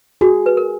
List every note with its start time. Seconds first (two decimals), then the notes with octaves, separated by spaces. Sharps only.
0.21 F#4 G#4
0.46 B4
0.57 A#4